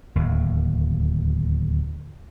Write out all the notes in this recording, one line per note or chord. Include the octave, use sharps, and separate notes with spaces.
D1 D#2